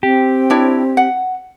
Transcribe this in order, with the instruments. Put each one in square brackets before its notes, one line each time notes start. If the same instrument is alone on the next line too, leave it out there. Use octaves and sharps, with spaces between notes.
[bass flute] C4 [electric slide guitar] G4
[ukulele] D4 E4 C#5
F#5